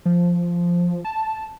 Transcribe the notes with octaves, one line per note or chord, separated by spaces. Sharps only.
F3
A5